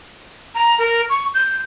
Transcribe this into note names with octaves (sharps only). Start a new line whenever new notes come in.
A#5
A#4
C#6
G6